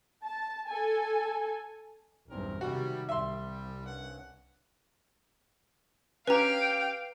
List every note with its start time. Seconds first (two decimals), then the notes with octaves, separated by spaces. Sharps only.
0.24 A5
0.68 A4 G#5
2.30 B1 E2 G2 C4 C#4 A#4
2.61 C3 D#3 G3 F#4
3.09 C2 G3 E5 C6
3.85 G2 C#4 F#5
6.27 C#4 G4 B4 F5 G5 A#5